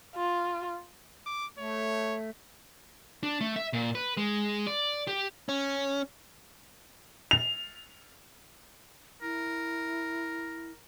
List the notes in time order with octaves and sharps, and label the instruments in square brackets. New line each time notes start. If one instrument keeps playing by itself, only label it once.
[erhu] F4
[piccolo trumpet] D6
[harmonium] A3 [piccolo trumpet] C#5
[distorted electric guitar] D4
A3
E5
A#2
B4
G#3
D5
G4
[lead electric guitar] C#4
[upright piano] F7
[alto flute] E4 [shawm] A#4